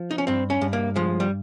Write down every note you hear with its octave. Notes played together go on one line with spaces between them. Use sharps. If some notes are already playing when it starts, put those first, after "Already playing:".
Already playing: F3
D#4
C#4
G2 C4
C#4
G2
A#3
F3 G#3
G3